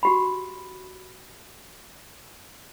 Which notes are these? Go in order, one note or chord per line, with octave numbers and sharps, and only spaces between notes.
F#4 G4 B5